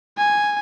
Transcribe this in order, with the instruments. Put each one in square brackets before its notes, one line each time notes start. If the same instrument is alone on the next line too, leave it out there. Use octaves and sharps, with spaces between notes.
[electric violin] G#5